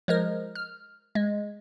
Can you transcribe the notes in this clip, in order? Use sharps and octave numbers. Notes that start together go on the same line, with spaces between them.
F3 G#3 A#4
F6
G#3